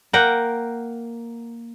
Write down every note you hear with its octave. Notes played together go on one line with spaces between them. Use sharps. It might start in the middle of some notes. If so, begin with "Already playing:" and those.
A#3 A#4 F#5 G5